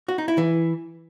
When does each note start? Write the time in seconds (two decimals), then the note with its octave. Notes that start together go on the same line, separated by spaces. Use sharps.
0.08 F#4
0.18 D#4
0.28 E4
0.38 E3